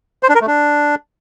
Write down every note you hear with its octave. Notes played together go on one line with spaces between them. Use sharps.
C5
D4
A#4
A3
D4